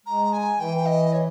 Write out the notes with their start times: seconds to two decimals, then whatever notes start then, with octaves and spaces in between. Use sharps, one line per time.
0.06 G#3 A#5
0.33 G#5
0.59 E3 G5
0.86 D#5
1.13 C#5